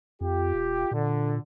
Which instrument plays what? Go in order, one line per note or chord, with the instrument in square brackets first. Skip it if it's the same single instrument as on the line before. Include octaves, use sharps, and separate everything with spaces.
[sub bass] F2 [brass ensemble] F4 G4
[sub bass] E1
[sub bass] A#2 [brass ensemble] D3